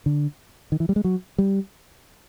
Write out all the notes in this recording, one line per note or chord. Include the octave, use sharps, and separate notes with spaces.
D3
D#3
E3
G3
G#3
F#3
G3